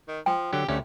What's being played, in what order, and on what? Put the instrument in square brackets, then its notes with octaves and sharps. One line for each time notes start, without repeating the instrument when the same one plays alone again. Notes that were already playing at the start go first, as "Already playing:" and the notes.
[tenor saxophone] D#3
[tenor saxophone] F3 [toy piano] G5
[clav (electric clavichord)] D3 F#3 [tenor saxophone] G4
[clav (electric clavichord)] D2 C#4 G4 [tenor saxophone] A3